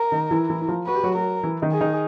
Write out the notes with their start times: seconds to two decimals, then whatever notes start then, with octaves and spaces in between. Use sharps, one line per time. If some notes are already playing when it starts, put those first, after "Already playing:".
Already playing: A#4
0.12 D#3 D#4
0.31 E3 E4
0.50 E3 E4
0.62 E4
0.68 F3 F4
0.86 F#4 B4
0.95 G4
1.03 F#3 F#4
1.15 F#3 F#4 A#4
1.43 E3 E4
1.62 D#3 D#4
1.72 G#4
1.81 D#3 D#4